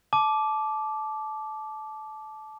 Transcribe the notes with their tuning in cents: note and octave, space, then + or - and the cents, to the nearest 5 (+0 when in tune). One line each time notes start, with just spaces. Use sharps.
A5 -20 D6 +0